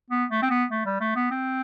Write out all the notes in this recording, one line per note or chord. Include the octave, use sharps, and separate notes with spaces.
B3
A3
C4
B3
A3
G3
A3
B3
C4